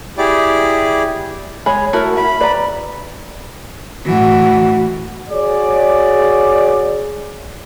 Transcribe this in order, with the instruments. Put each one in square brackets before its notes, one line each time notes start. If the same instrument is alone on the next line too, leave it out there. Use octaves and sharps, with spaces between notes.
[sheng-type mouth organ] E4 G4 G#4 D5
[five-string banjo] G#3 G#4 [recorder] C#5 [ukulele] B5
[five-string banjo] A3 E4 F#4 [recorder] A#4
[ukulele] E5 [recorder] B5
[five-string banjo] B4 [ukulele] D5 A#5
[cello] A2 E3 [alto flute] F#4
[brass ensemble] F#4 G#4 C#5 D5